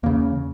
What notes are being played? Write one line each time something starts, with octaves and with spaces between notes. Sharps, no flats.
E2 C#3 A#3